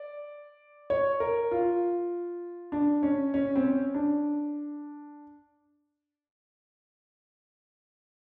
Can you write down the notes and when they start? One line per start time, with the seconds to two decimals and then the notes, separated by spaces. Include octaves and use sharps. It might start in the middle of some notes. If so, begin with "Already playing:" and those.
Already playing: D5
0.90 C#5
1.20 A#4
1.51 F4
2.72 D4
3.03 C#4
3.34 C#4
3.56 C4
3.64 C#4
3.94 D4